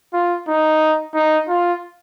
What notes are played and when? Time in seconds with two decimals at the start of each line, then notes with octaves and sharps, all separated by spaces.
0.13 F4
0.48 D#4
1.14 D#4
1.49 F4